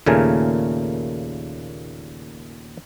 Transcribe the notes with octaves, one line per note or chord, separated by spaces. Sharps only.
D#2 A#2 C#3 A3 A#4 G#5